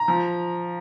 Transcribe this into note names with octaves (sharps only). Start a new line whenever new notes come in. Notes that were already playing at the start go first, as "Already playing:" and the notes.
Already playing: A#5
F3